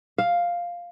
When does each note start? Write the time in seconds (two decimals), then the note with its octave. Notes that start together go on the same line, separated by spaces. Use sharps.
0.18 F5